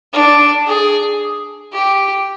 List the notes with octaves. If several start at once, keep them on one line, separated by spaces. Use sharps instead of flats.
D4
G#4
G4